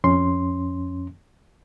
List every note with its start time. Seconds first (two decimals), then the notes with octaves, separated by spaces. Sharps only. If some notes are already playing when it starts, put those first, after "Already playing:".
0.04 F2 C#4 C6